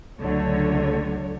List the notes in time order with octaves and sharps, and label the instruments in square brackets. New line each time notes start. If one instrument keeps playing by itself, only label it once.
[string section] C#2 D3 F#3 A3 C#5